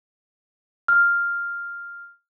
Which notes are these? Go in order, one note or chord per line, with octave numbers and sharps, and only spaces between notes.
F6